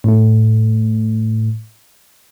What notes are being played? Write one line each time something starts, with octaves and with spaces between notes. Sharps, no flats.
A2 A3